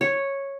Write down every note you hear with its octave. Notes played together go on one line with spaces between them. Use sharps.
C#5